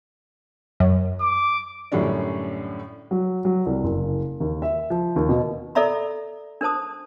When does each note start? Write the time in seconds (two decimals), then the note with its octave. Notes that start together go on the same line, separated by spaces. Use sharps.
0.80 F#2
1.21 D6
1.92 F#2 A2 D3 G3 C#4 D4
3.11 F#3
3.45 F#3
3.66 C2
3.84 F#1
4.40 D#2
4.62 E5
4.90 F3
5.16 D#2
5.29 B2
5.75 A4 A#4 D5 E5 A#5 B5
6.61 D4 A#4 C5 A5 D#6